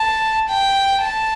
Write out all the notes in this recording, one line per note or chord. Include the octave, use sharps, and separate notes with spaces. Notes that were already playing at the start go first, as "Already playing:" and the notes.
Already playing: A5
G5
A5